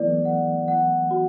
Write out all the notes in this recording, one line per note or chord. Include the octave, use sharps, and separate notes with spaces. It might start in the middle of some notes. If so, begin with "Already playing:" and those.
Already playing: E3 F#3 A3 B3 E4 D5
F#5
F#5
F#4